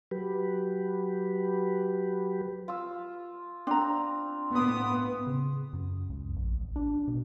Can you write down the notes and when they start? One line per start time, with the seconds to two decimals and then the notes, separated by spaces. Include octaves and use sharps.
0.11 F#3 G4 B4
2.68 F4 E6
3.67 C4 D4 A#5
4.55 A2 B3 B5 C6 D6 D#6
5.27 C#3
5.73 F#2
6.10 C#2
6.36 A#1
6.61 A1
6.76 D4
7.08 B2